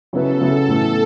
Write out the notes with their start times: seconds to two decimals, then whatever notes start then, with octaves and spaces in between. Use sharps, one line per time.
0.13 C#3 F#3 B3 E4 A4 B4
0.41 C#3 F#3 B3 E4 B4
0.68 A2 E3 B3